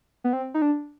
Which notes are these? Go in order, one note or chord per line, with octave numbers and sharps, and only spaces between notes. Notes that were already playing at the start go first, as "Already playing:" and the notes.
B3
C4
D#4
D4